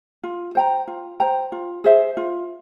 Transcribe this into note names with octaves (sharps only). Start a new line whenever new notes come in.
F4
C5 G5 A#5
F4
C5 G5 A#5
F4
G#4 C5 E5
F4